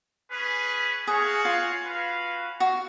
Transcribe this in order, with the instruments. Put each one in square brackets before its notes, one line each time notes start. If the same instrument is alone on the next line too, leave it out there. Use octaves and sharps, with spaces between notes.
[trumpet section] C#4 G#4 B4
[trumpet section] F#4 C#5 F5 [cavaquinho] G#4
[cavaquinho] F4
[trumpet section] C#4 F#4 B4 F5
[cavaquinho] F#4